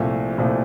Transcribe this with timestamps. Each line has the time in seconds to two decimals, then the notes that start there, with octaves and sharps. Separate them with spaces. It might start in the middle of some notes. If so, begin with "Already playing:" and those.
Already playing: C2 A#2 F3 A3
0.38 C2 A#2 F3 A3